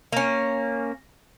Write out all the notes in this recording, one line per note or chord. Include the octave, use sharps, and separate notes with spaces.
A#3 C#4